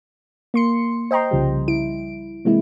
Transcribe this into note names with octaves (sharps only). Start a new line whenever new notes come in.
A#3 C6 C#7
C5 D#5 G5 A#5 C6
C2 C#3 F3 G3
E4 D7
C3 E3 G#3 A#3 E4